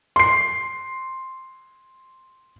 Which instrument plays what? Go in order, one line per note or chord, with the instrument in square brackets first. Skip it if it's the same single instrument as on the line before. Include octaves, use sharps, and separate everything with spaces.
[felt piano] C6 C7